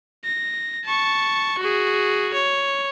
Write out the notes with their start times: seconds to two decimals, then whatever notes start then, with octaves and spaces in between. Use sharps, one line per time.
0.24 A#6
0.85 A5 C#6
1.59 F#4 G#4
2.34 C#5